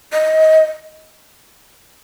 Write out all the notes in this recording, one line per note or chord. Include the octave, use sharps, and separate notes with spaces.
D#5